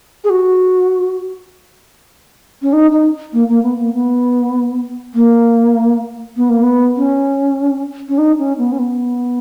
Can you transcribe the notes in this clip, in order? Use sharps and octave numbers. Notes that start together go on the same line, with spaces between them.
G#4
F#4
C#4
D#4
D#4
A#3
A#3
B3
A#3
B3
A#3
B3
A#3
B3
C#4
C#4
D#4
C#4
B3
C#4
B3